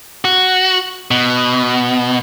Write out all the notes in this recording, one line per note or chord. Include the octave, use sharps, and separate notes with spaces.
F#4
B2